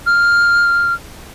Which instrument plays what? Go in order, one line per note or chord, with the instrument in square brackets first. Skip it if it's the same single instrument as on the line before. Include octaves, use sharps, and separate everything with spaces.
[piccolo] F6